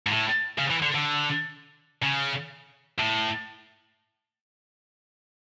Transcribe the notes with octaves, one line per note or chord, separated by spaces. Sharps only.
G#2
A2
C#3
E3
D3
D3
C#3
A2